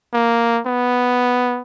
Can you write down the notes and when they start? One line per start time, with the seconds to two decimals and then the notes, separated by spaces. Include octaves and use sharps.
0.13 A#3
0.66 B3